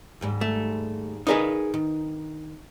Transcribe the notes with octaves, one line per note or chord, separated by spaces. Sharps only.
D#2 G#2 G3
A3
D#4 G#4 A#4 B4 D5 F5
D#3